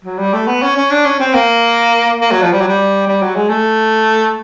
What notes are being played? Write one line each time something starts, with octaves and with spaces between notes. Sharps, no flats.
F#3
G3
A3
B3
C#4
C#4
D4
C#4
C4
A#3
A#3
F#3
F3
G3
F#3
G3
G3
F#3
G#3
A3